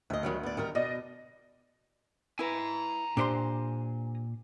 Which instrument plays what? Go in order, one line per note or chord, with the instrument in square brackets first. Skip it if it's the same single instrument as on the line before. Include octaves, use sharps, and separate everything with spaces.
[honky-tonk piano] D2 [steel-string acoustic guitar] D#5 E5
[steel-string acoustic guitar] D#3 F#3 G3
B3 D5
D#3 G3 A#4
[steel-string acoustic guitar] B2 [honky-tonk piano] D5 D#5
[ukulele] E4 B4 [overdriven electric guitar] G#5 A#5
[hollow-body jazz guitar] A#2 A#4 C6 [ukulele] D4 G4 C5